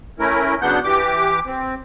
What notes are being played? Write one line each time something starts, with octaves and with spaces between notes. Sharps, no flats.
A3 C#4 E4 A#4
C#3 F#3 B3 D4 F#5 G6
E3 G4 D6
C4